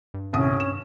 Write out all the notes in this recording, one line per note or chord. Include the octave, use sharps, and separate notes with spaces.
G2
D#1 C2 C#4 D#6
E7